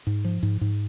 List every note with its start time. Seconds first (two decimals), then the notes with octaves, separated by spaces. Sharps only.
0.07 G#2
0.24 F3
0.43 G#2
0.61 G#2